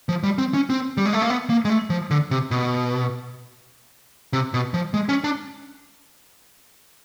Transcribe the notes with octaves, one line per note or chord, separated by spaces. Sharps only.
F3
G3
C4
C#4
C4
G3
G#3
A3
A#3
B3
A#3
G#3
A3
F3
D3
C3
B2
C3
B2
F3
G#3
C#4
D4